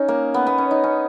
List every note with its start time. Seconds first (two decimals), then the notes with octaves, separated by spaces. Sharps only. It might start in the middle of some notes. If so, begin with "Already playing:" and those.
Already playing: C#4 D#4
0.08 A#3
0.34 B3
0.47 B3
0.58 C#4
0.71 D#4
0.84 C#4